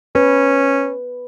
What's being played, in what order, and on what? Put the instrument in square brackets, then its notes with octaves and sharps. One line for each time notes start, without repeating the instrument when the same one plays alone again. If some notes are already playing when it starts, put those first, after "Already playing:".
[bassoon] C#4 [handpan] B4